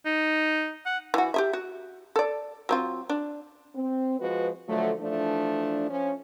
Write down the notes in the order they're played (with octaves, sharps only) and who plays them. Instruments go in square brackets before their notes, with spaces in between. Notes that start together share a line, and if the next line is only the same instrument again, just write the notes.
[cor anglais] D#4
F#5
[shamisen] E3 F#4
G4 G#4 E5
F#4
A4 D5
F#3 C4 F4
D4
[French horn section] C4
F3 G#3 F#4 B4
D3 F3 F#3 A3
E3 F3 A3 D4
F3 C#4